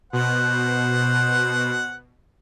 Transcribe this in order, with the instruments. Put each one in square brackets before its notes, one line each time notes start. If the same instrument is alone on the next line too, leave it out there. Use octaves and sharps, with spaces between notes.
[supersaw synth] B2 [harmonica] C5 F#5